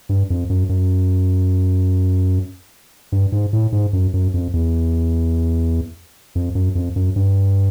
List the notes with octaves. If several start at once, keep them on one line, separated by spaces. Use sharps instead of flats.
G2
F2
F#2
F#2
G2
G#2
A2
G#2
F#2
F#2
F2
E2
F2
F#2
F2
F#2
G2